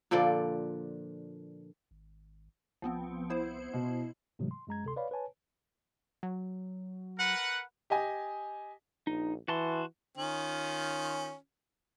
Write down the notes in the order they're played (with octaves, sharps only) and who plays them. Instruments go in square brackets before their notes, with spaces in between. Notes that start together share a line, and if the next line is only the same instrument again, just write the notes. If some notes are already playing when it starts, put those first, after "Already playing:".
[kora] A#2 D3 F3 D5
[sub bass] G#1
[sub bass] C2 [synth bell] F3 B3 C4
[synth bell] B3 E4 C5
[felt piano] B2
[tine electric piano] G#2 C3 E3 F#3 G#3 A3
C6
F#2 G#3 A#5 G#6
D2 C3 A4 C6
B4 C#5 D5 F5 B5
B4 C#5 G#5 A5
[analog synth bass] F#3
[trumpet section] A#4 B4 F#5
[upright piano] G4 D#5 G#5
[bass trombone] A#1 [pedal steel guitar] D#4
[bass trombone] E3 [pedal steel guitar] F#4 A5 C6
[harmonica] D#3 C#4 F4